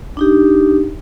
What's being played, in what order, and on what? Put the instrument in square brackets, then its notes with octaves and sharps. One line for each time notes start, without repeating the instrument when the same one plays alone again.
[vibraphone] D4 D#4 G4